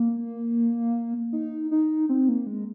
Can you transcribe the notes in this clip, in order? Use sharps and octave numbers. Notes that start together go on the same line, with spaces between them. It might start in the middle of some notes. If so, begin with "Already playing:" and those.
Already playing: A#3
D#4
D#4
C4
A#3
G#3